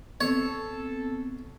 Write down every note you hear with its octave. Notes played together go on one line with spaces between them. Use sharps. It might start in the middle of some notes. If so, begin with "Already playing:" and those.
B3 C4 A4 C#5